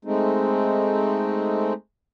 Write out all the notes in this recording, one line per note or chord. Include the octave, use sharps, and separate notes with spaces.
G#3 A3 C4 D#4